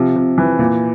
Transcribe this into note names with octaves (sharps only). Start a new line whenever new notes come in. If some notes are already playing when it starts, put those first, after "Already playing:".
Already playing: C3 F3
C3
E3
A#2